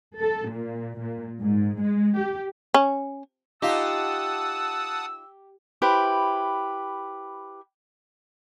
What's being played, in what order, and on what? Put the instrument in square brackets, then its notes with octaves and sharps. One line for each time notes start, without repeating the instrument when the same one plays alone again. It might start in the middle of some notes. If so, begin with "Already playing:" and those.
[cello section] A4
A#2
A#2
G#2
G#3
G4
[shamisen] C#4
[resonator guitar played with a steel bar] D#4 F4 [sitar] G4 [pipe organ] F#5 A5 D#6 [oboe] E6
[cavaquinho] E4 G4 B4 C5